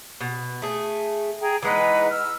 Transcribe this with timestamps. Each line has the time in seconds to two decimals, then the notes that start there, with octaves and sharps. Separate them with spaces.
0.21 B2
0.62 A3 G#4
1.41 G#4 G5 A#5
1.62 E3 G#3 D#4 B4 F#5 A#5
2.11 E6 F6